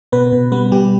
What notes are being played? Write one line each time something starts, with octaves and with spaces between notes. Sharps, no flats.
B2 B3 B4
B2
G3 B3 B4
B2 G3 G4